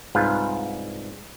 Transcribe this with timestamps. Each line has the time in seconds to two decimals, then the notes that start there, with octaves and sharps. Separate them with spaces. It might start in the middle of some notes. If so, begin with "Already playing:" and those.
0.15 C2 G#2 F4 B4 F5